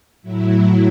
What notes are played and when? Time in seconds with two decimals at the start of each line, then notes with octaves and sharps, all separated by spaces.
0.22 A2 F#3 E4